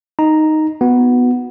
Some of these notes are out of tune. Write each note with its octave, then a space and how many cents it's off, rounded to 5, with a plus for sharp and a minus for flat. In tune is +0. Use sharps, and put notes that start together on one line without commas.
D#4 +0 A#5 +0
B3 +0 F#4 -20